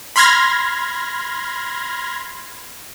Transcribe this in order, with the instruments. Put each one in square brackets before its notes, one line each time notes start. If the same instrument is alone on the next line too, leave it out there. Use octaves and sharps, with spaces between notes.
[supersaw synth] B5 C6 F6 G#6 A#6